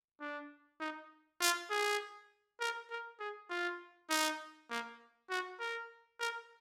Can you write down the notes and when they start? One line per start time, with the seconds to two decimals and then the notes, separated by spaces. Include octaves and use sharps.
0.21 D4
0.80 D#4
1.41 F4
1.70 G#4
2.60 A#4
2.90 A#4
3.20 G#4
3.50 F4
4.10 D#4
4.70 A#3
5.30 F#4
5.60 A#4
6.20 A#4